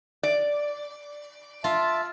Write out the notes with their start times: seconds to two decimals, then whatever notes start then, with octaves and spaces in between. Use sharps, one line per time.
0.23 D5
1.64 F4 E5 A5